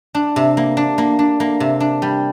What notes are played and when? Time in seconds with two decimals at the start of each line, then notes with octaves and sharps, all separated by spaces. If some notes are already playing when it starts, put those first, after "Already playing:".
0.15 D4
0.36 C3
0.57 A#3
0.77 D4
0.98 A#3
1.19 D4
1.40 A#3
1.60 C3
1.80 D4
2.02 G3